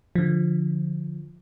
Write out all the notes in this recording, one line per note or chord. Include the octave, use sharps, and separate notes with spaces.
D3 F3